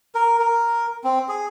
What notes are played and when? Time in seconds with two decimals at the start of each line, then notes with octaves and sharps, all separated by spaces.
0.15 A#4
0.39 A#4
1.04 C4
1.29 G#4